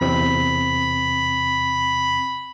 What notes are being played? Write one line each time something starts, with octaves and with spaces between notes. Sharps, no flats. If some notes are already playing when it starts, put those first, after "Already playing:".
E2 C3 C4 B5